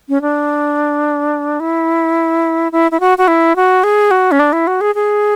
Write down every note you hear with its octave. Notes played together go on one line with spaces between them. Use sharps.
C#4
D4
E4
E4
E4
F#4
F#4
E4
F#4
G#4
F#4
C#4
D4
E4
F#4
G#4
G#4